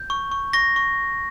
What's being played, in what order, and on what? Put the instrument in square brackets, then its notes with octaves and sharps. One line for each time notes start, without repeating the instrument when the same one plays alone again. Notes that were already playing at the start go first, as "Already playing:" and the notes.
Already playing: [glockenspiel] G6
C#6
C#6
C#6 A#6
C#6